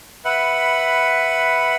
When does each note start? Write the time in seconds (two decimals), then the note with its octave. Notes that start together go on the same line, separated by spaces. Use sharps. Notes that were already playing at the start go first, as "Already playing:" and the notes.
0.25 B4 E5 F#5 B5